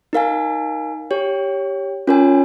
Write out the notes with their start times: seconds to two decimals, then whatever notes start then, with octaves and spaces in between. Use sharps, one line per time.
0.13 D#4 A#4 F5 G#5
1.10 G4 C#5 G5
2.07 C#4 F4 A#4 C#5 G#5